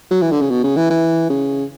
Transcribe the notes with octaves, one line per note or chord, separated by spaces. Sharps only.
F#3
E3
D3
C#3
B2
C#3
E3
E3
C#3